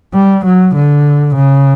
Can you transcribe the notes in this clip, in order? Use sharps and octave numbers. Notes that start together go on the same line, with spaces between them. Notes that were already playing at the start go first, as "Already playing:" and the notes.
G3
F#3
D3
C#3